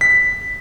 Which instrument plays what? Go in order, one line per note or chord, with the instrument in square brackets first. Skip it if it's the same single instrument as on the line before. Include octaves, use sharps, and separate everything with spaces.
[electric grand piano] B6